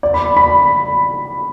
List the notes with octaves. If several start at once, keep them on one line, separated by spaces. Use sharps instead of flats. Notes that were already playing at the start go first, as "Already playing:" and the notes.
D5
B5
B5